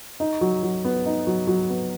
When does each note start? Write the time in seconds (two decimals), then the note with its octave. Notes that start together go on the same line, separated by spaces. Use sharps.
0.20 D#4
0.41 F#3
0.63 F#3
0.85 B3
1.06 D#4
1.27 F#3
1.47 F#3
1.70 B3